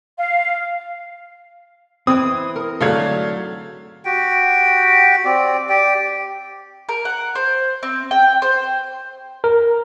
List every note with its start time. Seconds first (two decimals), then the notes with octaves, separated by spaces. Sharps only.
0.18 F5
2.07 E3 C4 E4 D#6
2.56 A#4
2.81 G#2 D3 F#3 A3 F5 G#6
4.05 F#4 G4 G5
5.25 C4 D5
5.69 G4 D5 G5
6.89 A#4
7.05 F#5
7.35 C5
7.83 C4
8.11 G5
8.42 C5
9.44 A#4